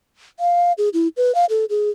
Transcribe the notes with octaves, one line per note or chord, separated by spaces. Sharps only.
F5
G#4
E4
B4
F5
A4
G#4